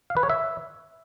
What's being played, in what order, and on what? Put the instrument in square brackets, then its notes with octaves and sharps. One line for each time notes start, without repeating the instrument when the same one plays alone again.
[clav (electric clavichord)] F5
B4
C#5
E5